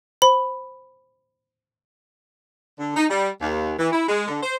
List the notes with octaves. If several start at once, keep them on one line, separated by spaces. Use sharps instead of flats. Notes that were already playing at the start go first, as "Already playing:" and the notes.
C5 B5
D3
D#4
G3
D#2
E3
E4
G#3
D3
C5